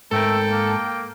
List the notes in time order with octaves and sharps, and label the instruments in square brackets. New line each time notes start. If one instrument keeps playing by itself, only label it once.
[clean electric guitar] G#2 A#4 [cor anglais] A3 [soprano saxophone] A4 [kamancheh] G5
[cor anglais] A#3